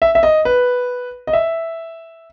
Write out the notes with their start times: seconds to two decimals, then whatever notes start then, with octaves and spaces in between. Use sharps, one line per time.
0.02 E5
0.15 E5
0.23 D#5
0.45 B4
1.27 D#5
1.33 E5